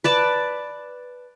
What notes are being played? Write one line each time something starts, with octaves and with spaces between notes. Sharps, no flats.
B4 D5 A5